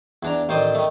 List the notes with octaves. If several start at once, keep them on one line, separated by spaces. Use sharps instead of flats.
E2 D4 A#5
A1 D#3 C5 D5 C6 D#6
D#3 A3